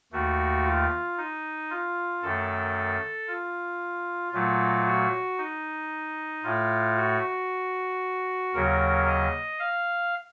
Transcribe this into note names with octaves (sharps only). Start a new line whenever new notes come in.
D#2 D#3 A3 F#4
F4
D#4
F4
F#2 D#3 A3 A4
F4
A#2 F#3 A3 F4
F#4
D#4
A2 A3 F4
F#4
D#2 C#3 F#3 A#4
D#5
F5